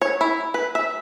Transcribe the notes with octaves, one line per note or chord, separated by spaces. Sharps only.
C#5
E4
B4
E5